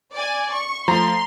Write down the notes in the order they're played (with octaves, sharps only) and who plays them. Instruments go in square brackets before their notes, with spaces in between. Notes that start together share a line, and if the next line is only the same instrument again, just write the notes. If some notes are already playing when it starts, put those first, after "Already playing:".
[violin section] D5 G#5
C#6
[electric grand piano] F3 A3 [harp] A#5 [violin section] C6